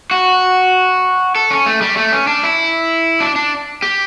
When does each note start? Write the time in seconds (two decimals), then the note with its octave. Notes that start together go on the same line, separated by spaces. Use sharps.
0.11 F#4
1.35 A4
1.50 C#4
1.66 A3
1.81 G3
1.97 A3
2.12 C#4
2.27 D4
2.44 E4
3.20 D4
3.36 D4
3.82 G4